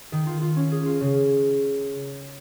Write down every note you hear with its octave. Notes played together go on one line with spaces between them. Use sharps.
D#3
F4
F4
C#4
G#4
F4
C#3